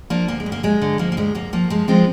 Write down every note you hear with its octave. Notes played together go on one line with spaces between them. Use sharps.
F3 A#3 D4
D2 A#3
G#3
D2
A#3
D2 G#3
D3
F3 A#3
A#3
D2 G#3
D2 A#3
F3 A#3
F3 G#3
F3 G#3 C4